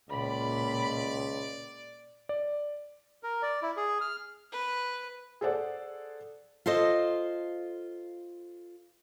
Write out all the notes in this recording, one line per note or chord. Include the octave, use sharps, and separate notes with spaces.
C#2 A#2 D5 B5
D5
A#4
D5
E4
G#4
F6
B4
G#4 A4 C5 D5 F#5
F4 A4 C5 D#5